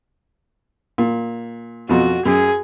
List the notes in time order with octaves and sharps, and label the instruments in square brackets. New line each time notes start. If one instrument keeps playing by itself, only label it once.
[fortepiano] A#2
[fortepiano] F2 B2 [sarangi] F#4
[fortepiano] F#2 [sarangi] G#4